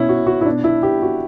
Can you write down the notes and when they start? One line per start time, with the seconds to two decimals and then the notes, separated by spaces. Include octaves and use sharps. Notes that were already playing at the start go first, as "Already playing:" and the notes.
Already playing: B2 C#4 E4
0.09 F#4
0.27 F#4
0.41 E4
0.45 B2 D4
0.64 E4
0.83 G4
1.02 F#4